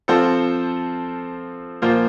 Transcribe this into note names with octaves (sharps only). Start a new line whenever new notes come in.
F3 C4 F4 A4 C5
A#2 F3 A#3 F4 C5